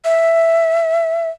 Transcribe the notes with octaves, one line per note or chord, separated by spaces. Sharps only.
E5